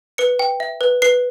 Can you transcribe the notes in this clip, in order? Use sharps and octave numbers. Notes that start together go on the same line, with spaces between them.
B4 C#7
G5
E5
B4
B4 C7